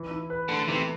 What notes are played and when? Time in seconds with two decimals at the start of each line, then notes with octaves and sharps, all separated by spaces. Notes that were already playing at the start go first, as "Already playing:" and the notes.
Already playing: E3
0.11 E4
0.30 B4
0.48 D3 A3
0.68 C3 E3